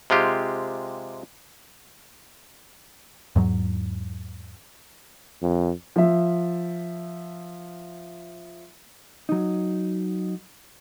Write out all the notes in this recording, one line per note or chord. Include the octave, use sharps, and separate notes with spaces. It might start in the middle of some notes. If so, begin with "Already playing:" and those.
C3 G#3 F4 G4
E2 G#2 F#3
F2
F3 E5
F#3 D#4